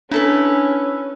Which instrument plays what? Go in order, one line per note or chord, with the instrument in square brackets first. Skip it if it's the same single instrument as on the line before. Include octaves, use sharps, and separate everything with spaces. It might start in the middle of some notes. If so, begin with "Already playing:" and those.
[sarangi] C#4 [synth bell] D4 [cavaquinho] E4 A4 B4